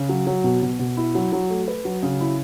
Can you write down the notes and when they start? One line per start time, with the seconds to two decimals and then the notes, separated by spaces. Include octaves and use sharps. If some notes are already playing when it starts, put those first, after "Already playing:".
Already playing: C#3
0.09 F#3
0.27 F#3
0.44 B2
0.62 B2
0.79 B2
0.97 E4
1.15 F#3
1.33 F#3
1.50 A3
1.68 B4
1.85 F#3
2.03 C#3
2.21 E4